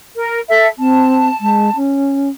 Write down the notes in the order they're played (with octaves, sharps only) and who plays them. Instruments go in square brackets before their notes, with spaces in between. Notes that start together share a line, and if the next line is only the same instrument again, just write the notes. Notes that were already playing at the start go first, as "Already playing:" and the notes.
[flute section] A#4
A4 E5
[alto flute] C4 [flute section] A5
[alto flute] G#3
C#4